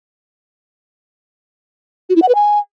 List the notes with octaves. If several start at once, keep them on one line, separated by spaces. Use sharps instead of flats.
F#4
E4
F#5
B4
G#5